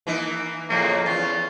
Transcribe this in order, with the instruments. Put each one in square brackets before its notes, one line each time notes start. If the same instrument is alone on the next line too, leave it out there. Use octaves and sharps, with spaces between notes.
[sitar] E3 A#3 D#4
[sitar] F2 A2 C#3 [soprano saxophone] A#3
[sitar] E2 C#4 [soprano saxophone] F4